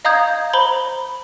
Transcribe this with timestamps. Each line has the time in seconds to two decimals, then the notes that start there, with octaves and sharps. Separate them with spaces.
0.05 D#5 F5 A#5 D#6 G6 G#6
0.53 C5 A#5 B5 G7